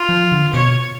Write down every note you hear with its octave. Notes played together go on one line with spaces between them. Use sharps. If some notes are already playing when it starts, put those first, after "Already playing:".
Already playing: F4
F3
D3
B2 C#5